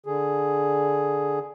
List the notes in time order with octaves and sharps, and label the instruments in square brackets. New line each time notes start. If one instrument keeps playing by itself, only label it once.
[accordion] D3 G#4